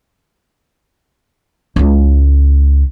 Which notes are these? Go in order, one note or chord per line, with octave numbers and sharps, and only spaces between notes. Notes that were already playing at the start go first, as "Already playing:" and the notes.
C#2 E4